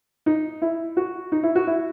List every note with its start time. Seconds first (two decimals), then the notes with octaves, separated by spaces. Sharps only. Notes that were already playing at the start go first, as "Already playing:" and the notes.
0.26 D#4
0.62 E4
0.97 F#4
1.32 D#4
1.43 E4
1.55 F#4
1.67 E4